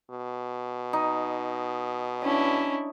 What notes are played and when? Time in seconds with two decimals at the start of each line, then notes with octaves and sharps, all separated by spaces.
0.10 B2
0.93 D#4
2.23 C#4 D4 E4